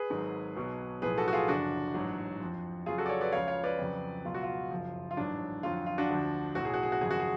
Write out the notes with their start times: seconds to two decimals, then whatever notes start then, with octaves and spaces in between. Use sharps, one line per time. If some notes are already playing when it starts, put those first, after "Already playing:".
Already playing: G#4 B4
0.10 G#1 G#2 F#3
0.56 B1 B2 F#3
1.02 B1 A2 F3 G#4 B4
1.18 F#4 A4
1.28 F#4
1.33 F4 G#4
1.48 F#1 F#2 D3 F3 D4 F#4
1.94 A1 G#2 F#3
2.40 F2 F3
2.86 F2 C#3 F#3 F4 G#4
2.98 F#4 A4
3.06 D5
3.09 A4 C#5
3.21 B4 D5
3.32 C#2 C#3 F3 C#5 F5
3.48 C#5 F5
3.64 B4 D5
3.79 F2 C#3 F#3
4.25 C#2 B2 F#3 F4
4.34 F#4
4.43 F4
4.71 F#1 F#2 F3
5.11 F4
5.17 A1 G#2 F#3 D4
5.63 F2 D3 F#3 F4
5.86 F4
5.98 D4 F#4
6.09 D2 D3 F3
6.55 B1 A2 F#3 F#4
6.65 G#4
6.74 F#4
6.83 G#4
6.92 F#4
7.01 G#1 F#2 C#3 F3 G#4
7.11 F#4
7.20 G#4